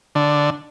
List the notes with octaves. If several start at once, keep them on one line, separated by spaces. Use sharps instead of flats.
D3